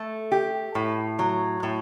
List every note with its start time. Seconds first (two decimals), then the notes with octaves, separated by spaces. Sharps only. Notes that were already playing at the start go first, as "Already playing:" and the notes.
Already playing: A3
0.32 G4
0.75 A2
1.19 F#3
1.63 A2